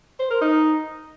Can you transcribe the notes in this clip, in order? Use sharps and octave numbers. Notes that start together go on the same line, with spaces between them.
C5
A#4
D#4